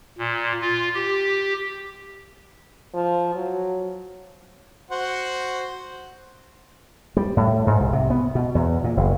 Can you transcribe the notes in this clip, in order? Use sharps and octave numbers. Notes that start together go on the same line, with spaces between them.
A#2
F4
G4
F3
F#3
F#4 C5 F#5
G3
A2
G#2
C2
C3
B3
B2
E2
A#2
F#1